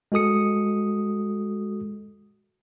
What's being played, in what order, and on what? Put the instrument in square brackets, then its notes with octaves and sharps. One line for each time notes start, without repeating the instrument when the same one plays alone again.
[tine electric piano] G#3 F#4 A4 D#6 C#7